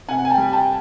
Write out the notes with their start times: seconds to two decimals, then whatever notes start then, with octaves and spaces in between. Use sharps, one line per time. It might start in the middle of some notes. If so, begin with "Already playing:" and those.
0.09 C3 F#5 G#5
0.25 G#5
0.30 G5 A5
0.38 G3
0.53 G5 A5